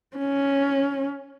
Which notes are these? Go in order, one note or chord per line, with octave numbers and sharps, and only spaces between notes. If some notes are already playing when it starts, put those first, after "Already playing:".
C#4